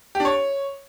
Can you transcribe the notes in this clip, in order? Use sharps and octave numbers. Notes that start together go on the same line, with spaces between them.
G4
D4
C#5